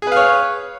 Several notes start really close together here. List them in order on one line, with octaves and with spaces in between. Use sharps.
G#4 B4 F5 C#5